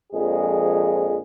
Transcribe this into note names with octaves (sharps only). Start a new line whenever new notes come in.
A#1 F2 G#3 G#4